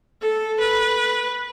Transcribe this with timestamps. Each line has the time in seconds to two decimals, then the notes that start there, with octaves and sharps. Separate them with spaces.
0.22 A4
0.60 B4